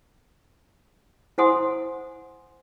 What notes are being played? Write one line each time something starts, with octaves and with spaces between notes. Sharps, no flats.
E4 C5 F#5 G#5 C6 D#6